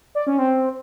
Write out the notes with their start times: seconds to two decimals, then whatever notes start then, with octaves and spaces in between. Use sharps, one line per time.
0.15 D5
0.27 C#4
0.38 C4